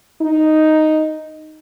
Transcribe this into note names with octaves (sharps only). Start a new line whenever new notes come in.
D#4